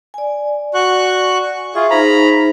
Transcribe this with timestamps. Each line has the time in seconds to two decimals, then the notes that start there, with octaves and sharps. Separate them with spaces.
0.14 D5 G#5
0.74 F#4 C#6 F#6
1.75 F4 G#4 E5 C#6
1.91 D#4 G#4 C5 A#5 B5